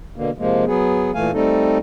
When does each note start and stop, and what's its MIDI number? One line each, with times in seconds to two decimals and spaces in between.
0.16 0.30 47
0.16 0.30 50
0.16 0.30 58
0.38 0.65 48
0.38 0.65 53
0.38 0.65 56
0.38 0.65 58
0.66 1.11 54
0.66 1.11 59
0.66 1.11 68
1.14 1.31 46
1.14 1.31 52
1.14 1.31 57
1.14 1.31 77
1.14 1.31 80
1.33 1.78 55
1.33 1.78 57
1.33 1.78 60
1.33 1.78 63
1.33 1.78 69